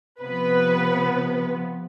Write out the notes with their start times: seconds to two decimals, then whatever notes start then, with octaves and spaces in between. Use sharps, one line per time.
0.21 C3 F3 B3 B4